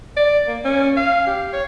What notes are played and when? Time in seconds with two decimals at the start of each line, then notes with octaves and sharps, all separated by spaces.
0.17 D5
0.48 A#3
0.65 C#4
0.97 F5
1.27 G4
1.53 C#5